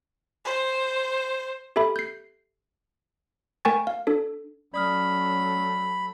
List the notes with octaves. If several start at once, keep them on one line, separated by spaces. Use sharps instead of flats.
C5
G4 A4 E5 B5
G6 C7
A3 A#4 G5 G#5 C#6 A6
F5
D4 A4
F#3 A3 C#4 D5 B5 D#6 F6